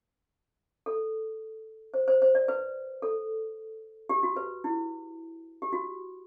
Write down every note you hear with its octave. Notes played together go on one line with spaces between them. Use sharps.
A4
C5
C5
C5
D5
B4
A4
G4
F#4
B4
E4
G4
F#4